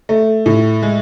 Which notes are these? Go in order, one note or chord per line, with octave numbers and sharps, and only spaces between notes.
A3
A2
G#3